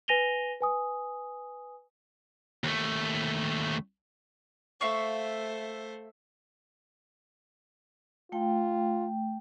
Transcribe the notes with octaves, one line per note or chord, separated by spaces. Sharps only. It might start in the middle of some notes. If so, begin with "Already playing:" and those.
B4 G#5 A#6 D#7 F7 G7
B4 G#5 D#6
D#2 A3
A3 C5 E5 F5 C#6
A3 F4 G5